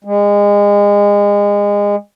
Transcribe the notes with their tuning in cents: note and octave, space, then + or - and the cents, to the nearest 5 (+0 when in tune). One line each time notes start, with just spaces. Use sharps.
G#3 -30